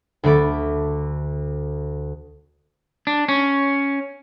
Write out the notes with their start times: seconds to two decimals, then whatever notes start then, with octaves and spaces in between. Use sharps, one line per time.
0.23 D2 D3 A3 B5 D6 A6
3.07 D4
3.29 C#4